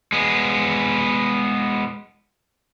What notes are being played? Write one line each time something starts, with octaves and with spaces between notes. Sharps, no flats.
G#3 B3